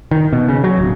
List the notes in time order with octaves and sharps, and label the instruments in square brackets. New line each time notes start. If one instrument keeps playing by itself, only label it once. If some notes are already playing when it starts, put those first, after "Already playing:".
[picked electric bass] D#3
B2
C#3
F#3
D1